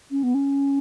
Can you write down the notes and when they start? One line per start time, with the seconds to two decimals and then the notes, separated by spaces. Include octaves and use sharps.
0.11 C#4
0.23 B3
0.35 C#4